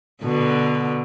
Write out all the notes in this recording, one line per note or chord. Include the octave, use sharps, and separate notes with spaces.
B2 D3